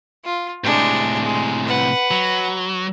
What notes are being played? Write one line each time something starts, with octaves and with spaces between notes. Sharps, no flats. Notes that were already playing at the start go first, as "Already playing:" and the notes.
F4
A2 C3 G#3 D4
G#3
B4 F#5
F#3